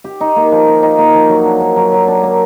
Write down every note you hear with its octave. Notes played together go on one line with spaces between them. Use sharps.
G4
D#4
A#3
F3
G4
D#4
A#3
F3
F#3
D4
A#3
F#3
F#3
D4
A#3